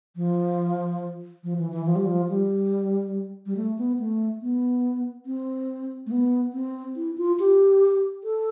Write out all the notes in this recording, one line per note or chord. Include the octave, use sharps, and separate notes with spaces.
F3
F3
E3
E3
F3
G3
F3
G3
G3
A3
B3
A3
B3
C4
A3
B3
C4
E4
F4
G4
A4